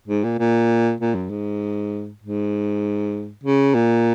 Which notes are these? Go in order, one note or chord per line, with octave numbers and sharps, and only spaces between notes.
G#2
A#2
A#2
A#2
F#2
G#2
G#2
C#3
A#2